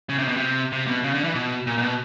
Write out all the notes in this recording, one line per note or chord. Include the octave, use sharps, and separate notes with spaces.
C#3
C3
B2
C3
C3
B2
C#3
D3
E3
B2
A#2
A#2
B2